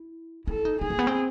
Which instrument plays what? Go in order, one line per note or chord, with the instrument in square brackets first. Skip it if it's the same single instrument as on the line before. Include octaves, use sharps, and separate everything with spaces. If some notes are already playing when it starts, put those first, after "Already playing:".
Already playing: [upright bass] E4
[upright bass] E4 [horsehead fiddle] A4
[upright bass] D#4
[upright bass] D#4 [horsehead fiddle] G#4
[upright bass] A#3
B3
C4